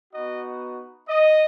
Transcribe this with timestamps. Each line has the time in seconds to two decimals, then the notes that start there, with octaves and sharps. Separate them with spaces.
0.14 B3 D#4 F#4 D#5
1.09 D#5